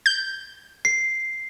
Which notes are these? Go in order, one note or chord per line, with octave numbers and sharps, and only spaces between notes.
G6
C7